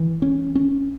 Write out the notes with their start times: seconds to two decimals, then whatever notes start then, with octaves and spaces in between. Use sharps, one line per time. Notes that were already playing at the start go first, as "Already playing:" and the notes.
Already playing: E3
0.22 C#4
0.55 C#4